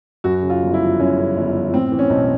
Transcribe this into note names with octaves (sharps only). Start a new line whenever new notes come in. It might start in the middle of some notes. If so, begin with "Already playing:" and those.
F#2 F#4
C#3
F4
G1
E4
F3
F#2 C#4
C#3
G1
F3
A2 C4
E3
C#4
B1